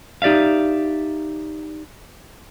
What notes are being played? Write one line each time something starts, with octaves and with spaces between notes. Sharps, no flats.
D#4 G4 D5 E5 F5